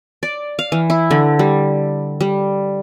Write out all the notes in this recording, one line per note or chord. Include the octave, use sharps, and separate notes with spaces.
D5
F5
E3
E4
D3
G3
G3